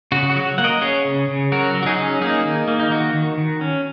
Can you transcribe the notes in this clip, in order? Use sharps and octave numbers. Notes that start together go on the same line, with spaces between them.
C#3 F#4
F#4
F#3
A#3 F#5
A#4 D#5
C#4 G#4 C#5
C#3
C#3
F#3 F#4 A#4
F#3
F#4
D#4 G#4
C#4
A#3 D#4 G#4
D#3
A#3
D#4
D#3 F#4
D#3
D#3
C#4